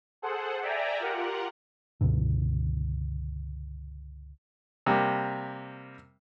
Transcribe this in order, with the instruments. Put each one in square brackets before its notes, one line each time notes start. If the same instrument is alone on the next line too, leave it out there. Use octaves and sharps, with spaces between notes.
[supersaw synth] G#4 A4 C5 F#5
D5 E5 G5 G#5 A#5
F4 G4 A#4 F#5
[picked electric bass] C#2 G2 B2 D3
[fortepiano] C3 G3 A#3